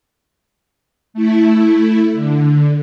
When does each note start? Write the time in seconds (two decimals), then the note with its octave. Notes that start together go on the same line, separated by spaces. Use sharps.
1.14 A3 E4
2.14 D3